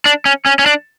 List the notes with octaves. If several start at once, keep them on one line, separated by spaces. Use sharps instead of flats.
D4
C#4
C#4
C#4
D4